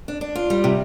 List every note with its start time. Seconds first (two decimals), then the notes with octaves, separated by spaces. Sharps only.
0.08 D4
0.21 D4
0.35 F4
0.50 G3
0.64 C3